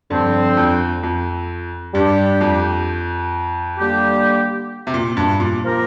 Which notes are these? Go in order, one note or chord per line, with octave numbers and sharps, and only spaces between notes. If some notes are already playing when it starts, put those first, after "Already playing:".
G2 D3 F3 C4
F2
F2
G2 G3 D4 G4
F2
D3 G3 A#3 G4
C3
A#2
G2
A#2
F3 A#3 G4 A#4